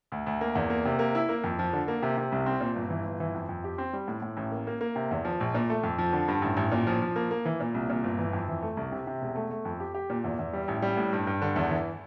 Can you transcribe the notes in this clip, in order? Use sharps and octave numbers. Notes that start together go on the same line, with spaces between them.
D2
D2
A#3
E2
A#3
C3
A#3
E4
A#3
F2
F3
D3
A#3
C3
C3
C2
C4
A#2
G1
E3
G1
E3
F2
F2
G4
C4
G3
A2
A2
A1
A#3
A#3
A#3
C3
E2
F3
A#1
A#2
A3
F2
F3
D3
G2
A1
A1
A#2
F3
F3
A#3
A#3
E3
A#2
C2
A#2
G1
E3
F2
E3
A3
C2
C3
C3
E1
A3
A3
F2
G4
G4
A#2
E2
E2
G3
A1
G3
A2
G2
G2
D3
E2
E3